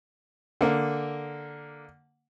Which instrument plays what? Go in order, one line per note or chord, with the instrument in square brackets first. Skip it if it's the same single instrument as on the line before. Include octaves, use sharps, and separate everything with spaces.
[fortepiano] D3 A#3